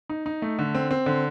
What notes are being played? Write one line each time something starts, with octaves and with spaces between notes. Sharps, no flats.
D#4
D#4
A3
D3
C4
C4
D3